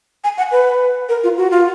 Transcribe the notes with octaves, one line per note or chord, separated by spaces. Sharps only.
G#5
F#5
B4
A#4
F4
F#4
F4